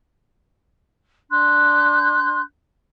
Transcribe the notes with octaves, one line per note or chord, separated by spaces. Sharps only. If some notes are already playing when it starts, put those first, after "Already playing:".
D4 C6 F#6 G6